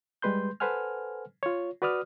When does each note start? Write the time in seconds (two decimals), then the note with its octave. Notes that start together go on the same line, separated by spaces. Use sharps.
0.22 G3 G#3 B4 C6 G6
0.60 A4 B4 C5 F#5 G#5 F6
1.43 F4 C#5
1.82 F#4 B4 D5 D#6 F6